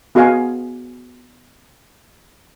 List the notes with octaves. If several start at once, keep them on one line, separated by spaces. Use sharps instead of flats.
B3 F#4 G#4 D#5 F5 G#5